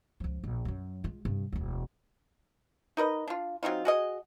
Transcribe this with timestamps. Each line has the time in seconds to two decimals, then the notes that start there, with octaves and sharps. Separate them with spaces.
0.20 C#2 F3
0.44 A#1
0.65 F#2 F#3
1.04 G#3 F4
1.25 G2 C3
1.52 E1 D2
2.97 D#4 A#4 B4 D#5
3.28 D4 F4
3.63 F#3 C4 D#4 F4
3.85 F#4 G#4 D#5